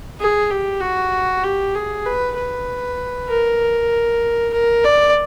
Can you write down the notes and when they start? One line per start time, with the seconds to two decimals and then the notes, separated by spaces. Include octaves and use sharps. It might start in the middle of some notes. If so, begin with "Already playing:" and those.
0.20 G#4
0.50 G4
0.81 F#4
1.44 G4
1.75 G#4
2.06 B4
2.36 B4
3.29 A#4
4.53 A#4
4.84 D5